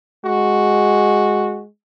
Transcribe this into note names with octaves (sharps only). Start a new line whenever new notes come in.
G#3 F#4